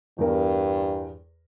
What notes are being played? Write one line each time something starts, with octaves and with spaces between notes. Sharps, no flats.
E2 G2 A#4